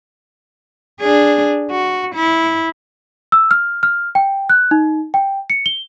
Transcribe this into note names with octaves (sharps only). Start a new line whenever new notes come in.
D4 G#4
F#4
E4
E6
F6
F6
G5
F#6
D#4
G5
C#7
G7